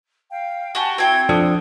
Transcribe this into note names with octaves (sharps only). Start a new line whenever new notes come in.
F5 G5
F#4 G4 G#5 A5
C4 E4 F#4 G5 G#6
F3 D4 A4 D#6